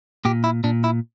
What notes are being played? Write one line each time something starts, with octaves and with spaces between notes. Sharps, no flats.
A#2 G4
E4
A#2 D4
E4